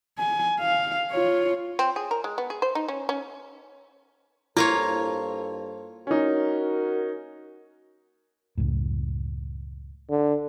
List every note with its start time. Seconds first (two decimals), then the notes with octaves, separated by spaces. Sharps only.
0.19 G#5
0.60 F5
1.11 F4 C#5
1.79 C4
1.96 G#4
2.11 A#4
2.24 G#3
2.38 B3
2.50 G#4
2.62 C5
2.75 D#4
2.88 C#4
3.09 C#4
4.57 G2 A#3 E4 F4 A4 C5 C#5
6.07 C#4 D#4 F#4 A#4
8.58 C#2 F#2 A2
10.10 D3